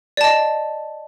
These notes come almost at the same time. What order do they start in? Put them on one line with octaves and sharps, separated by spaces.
D5 A5 D#5